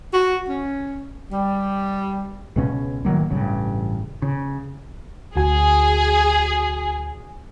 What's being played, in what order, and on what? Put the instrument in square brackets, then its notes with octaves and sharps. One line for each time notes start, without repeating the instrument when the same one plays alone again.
[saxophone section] F#4
C#4
G3
[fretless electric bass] C#2 B2 C#4
A1 D#3 F#3 A#3
A1 G2 C#3
C#3
[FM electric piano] D2 F#4 G#5 [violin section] G#4